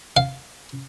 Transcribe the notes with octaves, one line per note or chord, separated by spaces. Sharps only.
F5